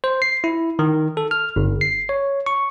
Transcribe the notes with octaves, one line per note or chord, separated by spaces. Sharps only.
C5
C7
E4
D#3
A4
F6
G1
C7
C#5
C#6